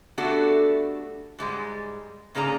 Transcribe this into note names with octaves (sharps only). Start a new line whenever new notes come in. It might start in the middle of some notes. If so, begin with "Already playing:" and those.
A3 B3 D4 F#4 G4 A4
G#2 G3 G#3
G#2 C#3 A#3 G#4 D5 A#5